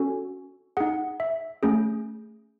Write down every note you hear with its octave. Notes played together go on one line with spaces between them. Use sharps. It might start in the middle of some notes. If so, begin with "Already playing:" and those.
Already playing: C#4 F#4 A4 G#5
D#4 G#4 F#5
E5
A3 C#4 G#4